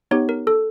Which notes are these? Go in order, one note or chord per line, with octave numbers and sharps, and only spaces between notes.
B3 D#4 G4 C#5
A#4
A4